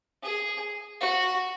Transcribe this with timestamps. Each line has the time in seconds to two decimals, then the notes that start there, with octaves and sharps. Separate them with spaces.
0.23 G#4
1.01 F#4